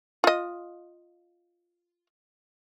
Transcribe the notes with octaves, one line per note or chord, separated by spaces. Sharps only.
F4 D#5